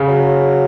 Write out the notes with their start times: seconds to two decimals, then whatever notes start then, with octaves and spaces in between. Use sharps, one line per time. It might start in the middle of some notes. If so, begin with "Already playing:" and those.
Already playing: C#3
0.08 F#3